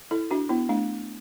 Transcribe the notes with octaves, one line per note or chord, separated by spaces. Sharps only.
E4 A4
D4 F#4
B3 E4
A3 D4